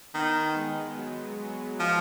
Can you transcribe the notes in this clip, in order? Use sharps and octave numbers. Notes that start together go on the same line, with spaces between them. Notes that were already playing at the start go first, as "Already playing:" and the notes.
D#3 B3
G#3
F#3
F#3
F3